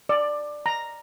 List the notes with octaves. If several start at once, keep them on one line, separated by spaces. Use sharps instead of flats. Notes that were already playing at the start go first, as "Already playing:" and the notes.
D5
A#5